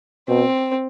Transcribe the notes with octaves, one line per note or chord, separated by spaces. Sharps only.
B2 C4